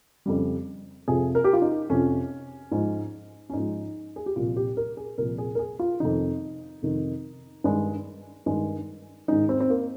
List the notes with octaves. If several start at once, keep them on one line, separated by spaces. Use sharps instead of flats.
F2 C#3 G3
F2 C3 F3 G#4
A#4
G4
F4
D#4
F2 C3 F3 C#4
G#2 F3 G#3
C#4
G#2 F3 G#3 D#4
G#4
G4
C2 A#2 F3 F4
G4
A#4
G#4
C2 A#2 F3 A#4
G#4
A#4
G#4
F4
F2 C3 D#3 D#4
F2 C3 D#3
G2 D#3 G#3
G2 D#3 G#3
G#2 D#3 G#3 D#4
C4
C4
A#3